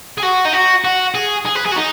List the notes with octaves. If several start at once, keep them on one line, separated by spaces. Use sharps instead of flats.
G#4
F#4
D#4
F#4
F#4
G#4
G#4
B4
G#4
F#4
D#4